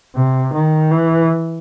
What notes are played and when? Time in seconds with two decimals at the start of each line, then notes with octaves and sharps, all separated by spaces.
0.15 C3
0.53 D#3
0.91 E3